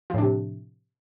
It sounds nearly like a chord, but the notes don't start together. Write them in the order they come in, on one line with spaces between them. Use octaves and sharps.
F3 A2 D4 C3